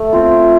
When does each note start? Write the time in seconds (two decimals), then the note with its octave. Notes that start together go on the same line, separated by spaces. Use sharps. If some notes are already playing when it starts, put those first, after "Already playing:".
Already playing: A3
0.13 C4 F4